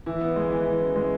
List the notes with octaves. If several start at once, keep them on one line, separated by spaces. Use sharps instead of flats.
E3 E4
B3
G#3
E3
E3
F#2
G#3